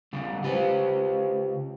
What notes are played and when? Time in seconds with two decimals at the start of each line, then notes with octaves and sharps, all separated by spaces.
0.13 C#3 G3
0.43 C#3 F4 G4 B4 C5